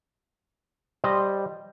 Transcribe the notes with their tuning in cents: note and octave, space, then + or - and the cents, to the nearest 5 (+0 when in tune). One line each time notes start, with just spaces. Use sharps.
G3 +0 C5 +0 D#5 -10